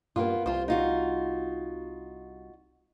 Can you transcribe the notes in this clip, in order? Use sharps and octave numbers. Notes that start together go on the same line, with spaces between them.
G2 A#3 B3 F4
C2 F4 C5
D#4 F4 F#4